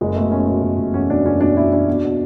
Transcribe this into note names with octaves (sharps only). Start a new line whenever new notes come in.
F#1 G#3
B2 A3
B2 C#4
B2
F#1
F#1
E2 C#4
B2 D4
F#1 C#4
B2 D4
B2 E4
E2 D4
B2
B2